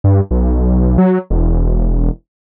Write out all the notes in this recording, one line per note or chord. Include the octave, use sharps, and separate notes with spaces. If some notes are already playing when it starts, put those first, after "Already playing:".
G2
B1
F#3
E1